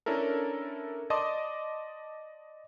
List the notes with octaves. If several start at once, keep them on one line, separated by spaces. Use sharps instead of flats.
C#4 D4 E4 A4 A#4
D5 D#5 A5 C6 D6 D#6